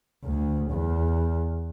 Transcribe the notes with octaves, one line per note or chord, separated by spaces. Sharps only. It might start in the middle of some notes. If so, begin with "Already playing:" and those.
D2
E2